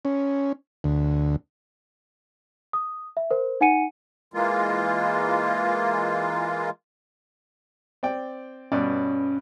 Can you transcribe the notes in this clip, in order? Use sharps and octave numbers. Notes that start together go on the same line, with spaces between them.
C#4
D2
D#6
E5
A#4 C5
D#4 F#5 G#5 C#7 D#7
E3 G#3 A#3 F4
C4 D5 G5
G2 B2 C#4 D5